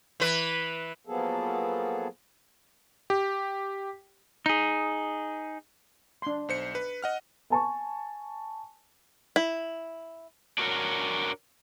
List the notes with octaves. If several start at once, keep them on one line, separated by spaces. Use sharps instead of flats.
E3 B4
F3 F#3 A#3 B3 G#4 A4
G4
D#4 G#4
D4 C6
B1 C5 C#7
B4
D#5 F#5 F6
G#5 A5 C#6
E4
D4 F#4 A#4 C#5